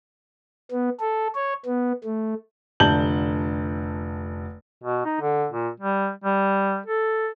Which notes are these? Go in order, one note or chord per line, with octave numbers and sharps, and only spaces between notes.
B3
A4
C#5
B3
A3
F1 D3 A5 G6 F#7 G7
B2
D#4
D3
A#2
G3
G3
A4